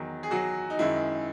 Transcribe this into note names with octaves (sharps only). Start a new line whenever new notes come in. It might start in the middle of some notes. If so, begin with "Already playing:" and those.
Already playing: E2 D#3 F#3
G#4
F#3 F#4
D#4
F#2 D#3 G#3 E4